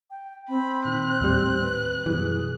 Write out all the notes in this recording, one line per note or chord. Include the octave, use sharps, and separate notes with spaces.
G5
C4 B5
A#2 D#3 F#6
D#2 A2 G3
B4
F#2 B2 E3 G3 G#4